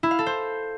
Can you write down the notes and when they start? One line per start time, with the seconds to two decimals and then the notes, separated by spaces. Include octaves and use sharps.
0.03 E4
0.11 F5
0.19 A4
0.26 C5